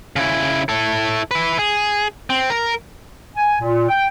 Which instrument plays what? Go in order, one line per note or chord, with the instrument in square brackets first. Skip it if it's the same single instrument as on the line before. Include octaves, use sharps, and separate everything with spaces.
[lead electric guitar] C#3 E4
E4 A4
B4 E5
G#4
C4
A#4
[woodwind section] G#5
A#2
G5